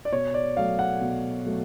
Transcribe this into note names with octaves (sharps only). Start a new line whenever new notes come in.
D5
B2 C#5
D5
F#3 A3 F5
F#5
B2
F#3 A3